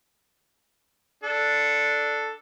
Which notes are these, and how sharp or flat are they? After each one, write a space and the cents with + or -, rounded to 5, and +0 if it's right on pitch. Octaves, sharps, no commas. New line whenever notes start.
D4 +0 A4 +0